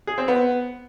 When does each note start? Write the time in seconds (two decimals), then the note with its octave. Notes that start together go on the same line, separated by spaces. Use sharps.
0.07 G#4
0.18 C4
0.28 B3